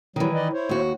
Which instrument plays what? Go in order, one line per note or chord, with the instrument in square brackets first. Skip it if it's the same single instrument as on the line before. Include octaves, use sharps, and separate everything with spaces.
[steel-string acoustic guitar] D#3 E3 [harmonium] F#3 G3
[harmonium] B4 D5 D#5
E4 C5 C#5
[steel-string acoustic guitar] D#2 F#4